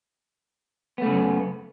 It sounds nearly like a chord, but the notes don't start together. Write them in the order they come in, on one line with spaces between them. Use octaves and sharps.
B3 A3 C#3 F#2